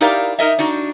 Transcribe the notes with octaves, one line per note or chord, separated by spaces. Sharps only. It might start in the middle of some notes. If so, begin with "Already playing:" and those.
D#4 E4 G4 A#4 D5 F5
D#4 A#4 D#5 E5
D4 D#4 F#4